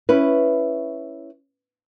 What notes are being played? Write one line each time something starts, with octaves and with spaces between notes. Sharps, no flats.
C#4 E4 B4